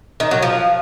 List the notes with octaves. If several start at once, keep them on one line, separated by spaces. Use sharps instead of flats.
D#3
F#3
F3